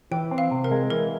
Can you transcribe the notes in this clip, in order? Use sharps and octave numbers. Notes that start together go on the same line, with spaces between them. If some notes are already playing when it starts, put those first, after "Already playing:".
E3 G5
C4
F5
C3
A#4
G#3
E3 A#4